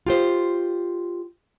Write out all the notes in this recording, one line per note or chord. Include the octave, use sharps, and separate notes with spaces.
F4 G4 C5